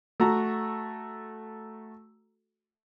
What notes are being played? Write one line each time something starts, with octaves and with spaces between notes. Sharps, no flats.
A3 F#4 A#5